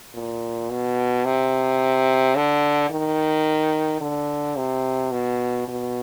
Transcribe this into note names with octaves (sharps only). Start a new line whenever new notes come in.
A#2
B2
C3
D3
D#3
D3
C3
B2
B2